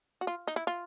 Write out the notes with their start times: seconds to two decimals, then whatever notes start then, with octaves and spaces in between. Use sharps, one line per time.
0.21 F#4
0.27 F4
0.47 D#4
0.56 E4
0.67 F4